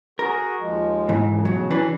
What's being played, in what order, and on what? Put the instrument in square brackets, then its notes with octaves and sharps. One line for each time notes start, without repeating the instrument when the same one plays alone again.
[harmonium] F#4 G#4 [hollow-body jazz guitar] A#4
[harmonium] D#2 F3 G#3
[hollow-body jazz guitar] G#2 E3
[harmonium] F#2 C#3 F3
[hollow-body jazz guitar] B1 F#3 [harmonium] C#3
[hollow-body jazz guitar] E3 D4 B4